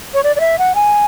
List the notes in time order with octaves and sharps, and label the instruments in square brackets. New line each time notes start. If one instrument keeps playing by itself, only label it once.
[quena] C#5
D5
D5
E5
F#5
G#5